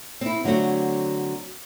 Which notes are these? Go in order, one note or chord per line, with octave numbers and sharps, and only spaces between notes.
C4 E4
D3 F#3 A3 C4 F#4